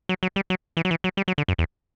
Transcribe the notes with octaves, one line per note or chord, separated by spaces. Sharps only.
F#3
F#3
G3
F#3
E3
F#3
E3
F#3
G3
F#3
D3
F#2
E2